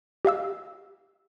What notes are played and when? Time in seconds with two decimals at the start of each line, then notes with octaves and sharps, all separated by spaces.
0.25 G4 D#5 F5 E6